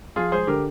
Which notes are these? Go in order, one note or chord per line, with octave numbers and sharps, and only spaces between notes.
F3 F4 G#4
G#3 G#4 C5
D3 G4 A#4